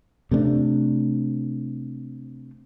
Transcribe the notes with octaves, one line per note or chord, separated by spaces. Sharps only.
C3 A3 C#4 D4